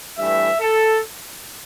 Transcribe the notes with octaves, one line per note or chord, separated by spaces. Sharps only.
G2 E3 A3 E5
A4